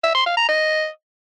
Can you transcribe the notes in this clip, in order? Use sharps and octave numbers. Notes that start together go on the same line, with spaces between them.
E5
C6
F5
A#5
D#5